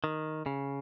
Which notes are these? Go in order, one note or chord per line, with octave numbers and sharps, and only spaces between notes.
D#3
C#3